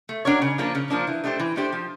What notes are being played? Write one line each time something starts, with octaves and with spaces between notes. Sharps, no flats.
A3
D4 F#4 A#4 C#5
C#3
F3 A#3 D4
C#3
F3 A#3 D4
E3
A3 D4 G4 C5
E3
A3 D4 G4 C5
F3